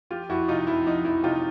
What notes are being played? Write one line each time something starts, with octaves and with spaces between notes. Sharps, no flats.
F3 F4 G4
F2 E4 F#4
C3 D#4 F4
F2 E4
F3 D#4
F2 E4
C3 D#4 F4